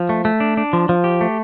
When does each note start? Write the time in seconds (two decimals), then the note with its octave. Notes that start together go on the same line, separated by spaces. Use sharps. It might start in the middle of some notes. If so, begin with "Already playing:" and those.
Already playing: F3
0.09 A3
0.25 A3
0.40 D4
0.57 D4
0.73 F3
0.89 F3
1.04 G4
1.21 A3